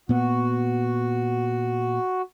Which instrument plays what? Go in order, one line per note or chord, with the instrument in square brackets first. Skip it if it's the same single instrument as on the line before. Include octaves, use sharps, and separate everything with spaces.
[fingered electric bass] A#2 B3 [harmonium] F#4